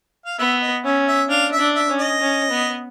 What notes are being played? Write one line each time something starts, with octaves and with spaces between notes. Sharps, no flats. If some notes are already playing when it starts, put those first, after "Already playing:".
F5
B3 E5
D#5
C#4 E5
E5
D4 F5
E5
D4
E5
C#4
D#5
C#4
B3